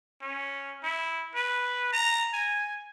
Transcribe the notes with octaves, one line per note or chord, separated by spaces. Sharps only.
C#4
E4
B4
A#5
G#5